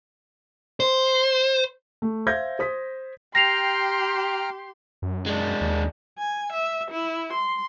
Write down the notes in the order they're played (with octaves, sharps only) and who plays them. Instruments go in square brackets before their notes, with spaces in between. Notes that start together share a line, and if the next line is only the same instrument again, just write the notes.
[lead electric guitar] C5
[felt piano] A3
C5 E5 F5 G6 G#6 A#6
C5 D#6 B6
[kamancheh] G4 C6 [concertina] G5 A#5 F6 [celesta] A#6 C7 F7
[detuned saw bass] F#2
[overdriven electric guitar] G#3 D4
[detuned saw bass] D#2
[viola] G#5
E5
E4
C6